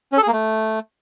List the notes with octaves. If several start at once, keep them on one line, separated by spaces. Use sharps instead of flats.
C#4
A4
G#4
A#3
A3